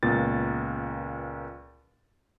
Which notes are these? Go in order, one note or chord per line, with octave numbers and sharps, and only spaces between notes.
C#2 A#2 B3 A6